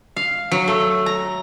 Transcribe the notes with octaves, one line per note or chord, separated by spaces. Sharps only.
F5
F#3
A3
A#5